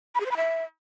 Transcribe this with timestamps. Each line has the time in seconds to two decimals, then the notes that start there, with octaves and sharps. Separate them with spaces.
0.15 B5
0.20 G#4
0.26 C5
0.31 B5
0.37 E5